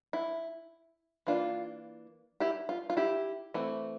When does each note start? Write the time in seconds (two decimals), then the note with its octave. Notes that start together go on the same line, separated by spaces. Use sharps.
0.13 E4
1.27 E3 A#3 D4 F4
2.40 E4 G4
2.69 F4
2.90 F4
2.97 E4 G4
3.54 E3 A3 C4